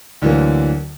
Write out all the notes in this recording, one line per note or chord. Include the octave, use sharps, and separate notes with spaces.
D2 D3 E3 F#3 A#3